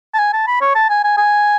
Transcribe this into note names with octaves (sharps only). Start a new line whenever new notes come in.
A5
G#5
A5
B5
C#5
A5
G#5
G#5
G#5